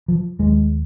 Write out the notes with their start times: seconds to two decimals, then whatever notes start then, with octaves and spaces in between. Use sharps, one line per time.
0.08 F3
0.39 D#2 G#3